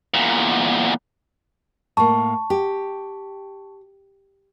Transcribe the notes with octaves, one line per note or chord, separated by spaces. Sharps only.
E2 A#2
A2 A#3 A5 C#6
G4